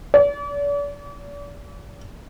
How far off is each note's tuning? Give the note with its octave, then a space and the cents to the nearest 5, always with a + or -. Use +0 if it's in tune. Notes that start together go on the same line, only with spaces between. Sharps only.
D5 -40